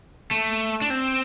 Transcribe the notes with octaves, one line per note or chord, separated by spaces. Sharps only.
A3
D4
C4